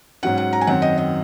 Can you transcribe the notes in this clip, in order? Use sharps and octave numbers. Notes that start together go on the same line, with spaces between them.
G#2 F#3 C#4 F#5
F#5
A#5
G#5
F#2 D#3 F#3 C4 F#5
D#5
D#5